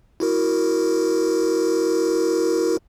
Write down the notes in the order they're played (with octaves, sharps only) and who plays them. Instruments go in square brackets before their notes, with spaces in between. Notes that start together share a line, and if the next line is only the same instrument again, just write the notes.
[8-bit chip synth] E4 F#4 A#4